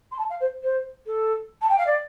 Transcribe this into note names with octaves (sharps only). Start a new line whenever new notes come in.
C6
A5
F5
C5
C5
A4
A5
G5
F5
D5